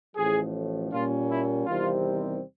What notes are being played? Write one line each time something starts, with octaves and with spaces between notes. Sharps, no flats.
A1 A2 F3 G#4
A#2 G3 A#3 C#4 F4
E4
E2 C3 D#3 G3 C4 F4